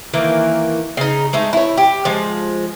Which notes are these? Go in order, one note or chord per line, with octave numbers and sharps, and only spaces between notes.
D#3 E3 A#3
C#3 D#4
G#3 A3 D#4
E4 C#5
G4
F3 G#3